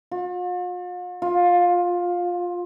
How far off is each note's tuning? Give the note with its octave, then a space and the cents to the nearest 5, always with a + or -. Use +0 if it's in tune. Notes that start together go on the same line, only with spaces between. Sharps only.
F4 +45
F4 +15